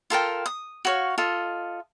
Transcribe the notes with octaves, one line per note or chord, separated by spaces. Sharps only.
F4 A4 A#4 G5
D#6
F#4 C#5 F5
F4 A4 D#5